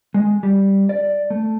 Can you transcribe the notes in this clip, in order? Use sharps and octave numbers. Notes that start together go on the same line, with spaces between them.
G#3
G3
D5
A3